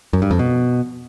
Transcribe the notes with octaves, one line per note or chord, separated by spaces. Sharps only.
F#2
G2
F2
B2